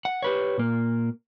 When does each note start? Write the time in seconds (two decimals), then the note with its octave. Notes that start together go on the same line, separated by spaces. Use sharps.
0.05 F#5
0.22 G4 B4 C#5
0.58 A#2 A#3